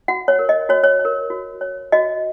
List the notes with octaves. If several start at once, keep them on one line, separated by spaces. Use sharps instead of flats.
F#4 F#5
C#5
A#4 C#5
D#5
F#4 C#5
C#5
C#5
A#4
F#4
C#5
F#4 D#5